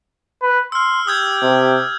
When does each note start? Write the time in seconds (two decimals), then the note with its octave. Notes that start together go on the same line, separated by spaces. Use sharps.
0.42 B4
0.72 C6 E6 F6
1.07 G4 D#6 G6 G#6
1.43 C3